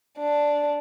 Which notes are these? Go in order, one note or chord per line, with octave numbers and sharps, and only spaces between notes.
D4